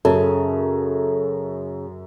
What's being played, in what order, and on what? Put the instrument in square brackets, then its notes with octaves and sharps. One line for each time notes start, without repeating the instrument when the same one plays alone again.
[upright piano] F#2 [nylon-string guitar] C#3 [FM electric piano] A4